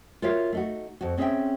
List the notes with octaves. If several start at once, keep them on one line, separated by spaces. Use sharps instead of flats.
F4 F#4 A#4 C#5 E5 F5
A3 D#4 F#4
F2 F#4
C4 C#4 G#4 D#5 E5 G5